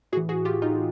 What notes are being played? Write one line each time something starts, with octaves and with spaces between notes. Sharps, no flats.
A2 E3 F#4 G#4
F#4 G#4
F4 G4
D#4 F4